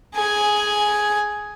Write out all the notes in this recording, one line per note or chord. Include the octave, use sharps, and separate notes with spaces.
G#4 G#5